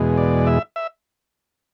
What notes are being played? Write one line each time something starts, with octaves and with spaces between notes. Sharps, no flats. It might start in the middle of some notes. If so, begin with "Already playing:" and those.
Already playing: E2 B2 G#3
D5
E5
E5